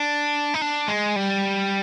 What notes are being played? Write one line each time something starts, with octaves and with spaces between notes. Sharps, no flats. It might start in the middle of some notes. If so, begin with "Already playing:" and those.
Already playing: D4
D#4
D4
G#3
G3